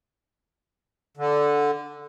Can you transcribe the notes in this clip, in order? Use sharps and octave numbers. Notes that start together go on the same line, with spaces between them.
D3